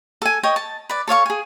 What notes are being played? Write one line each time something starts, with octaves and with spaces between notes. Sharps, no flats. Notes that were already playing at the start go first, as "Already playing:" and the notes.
A4 G#5
C#5 D#5 G5
A5
B4 D5
A4 C#5 F5 C#6
G#4 G#5